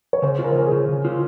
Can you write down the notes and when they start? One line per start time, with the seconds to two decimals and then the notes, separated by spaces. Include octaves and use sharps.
0.13 C#5
0.22 C#3 C5
0.39 F4
0.44 A#4
0.52 C5
0.55 C#3 A#4
0.66 G#4
0.72 C#3
0.89 C#3
1.05 F4